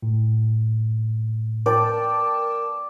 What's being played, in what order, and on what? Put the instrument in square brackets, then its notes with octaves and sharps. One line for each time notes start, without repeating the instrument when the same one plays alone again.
[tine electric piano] A2
[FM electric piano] A#4 G5 A5 [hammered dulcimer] D5